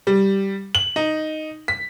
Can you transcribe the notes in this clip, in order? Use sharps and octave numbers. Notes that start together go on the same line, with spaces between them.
G3
F#7
D#4
B6